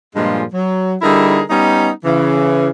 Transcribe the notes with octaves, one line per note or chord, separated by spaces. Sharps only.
G2 A#2 F3 G#3
F#3
D3 G3 D#4 E4 G#4 A#4
G3 B3 C#4 D#4
C#3 E3